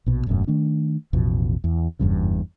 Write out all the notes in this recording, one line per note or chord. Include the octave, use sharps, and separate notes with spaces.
A#1 B2
E1 F#2 A2
D#3 A3 D4
A1 E2 B2 F3
E2
F#1 E2 G2 C#3